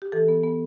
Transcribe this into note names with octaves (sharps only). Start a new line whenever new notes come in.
G4
E3 A4
B3
B3